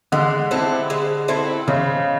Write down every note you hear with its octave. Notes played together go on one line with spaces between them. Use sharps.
D3 G#3
C4 E4 A4
G#3
C4 E4 A4
C#3 G#3